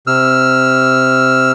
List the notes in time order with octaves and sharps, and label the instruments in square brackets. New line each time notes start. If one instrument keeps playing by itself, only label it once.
[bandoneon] C3 E6 F6